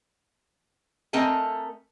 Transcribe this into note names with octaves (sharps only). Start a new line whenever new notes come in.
A3 C4 A#4 D#5 G#5